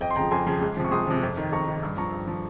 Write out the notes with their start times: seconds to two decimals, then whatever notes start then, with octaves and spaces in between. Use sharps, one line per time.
0.01 F2 D#5 G5
0.11 C6
0.16 C#3 F3 G5 A#5
0.31 F2 G#5 C6
0.46 C#3 F3
0.61 C#2
0.77 C3 F3
0.85 C#6
0.91 C#2 C6 D#6
1.07 C3 F3
1.22 F2
1.37 D#3
1.52 F2 A#5 C#6
1.67 D#3
1.83 G2
1.97 F3 A#5 C#6
2.13 G2
2.27 F3